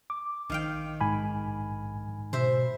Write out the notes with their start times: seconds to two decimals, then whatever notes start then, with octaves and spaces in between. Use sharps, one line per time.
0.10 D6
0.50 A#1 D#3 F5 G5
1.01 G#2 G#5 B5
2.33 B2 C5 E5